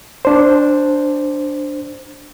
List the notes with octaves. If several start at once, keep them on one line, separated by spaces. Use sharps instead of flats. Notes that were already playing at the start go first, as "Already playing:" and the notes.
D4 C5